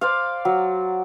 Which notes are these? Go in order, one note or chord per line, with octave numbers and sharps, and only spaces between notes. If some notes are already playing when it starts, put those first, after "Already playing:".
C5 D5 F5
F#3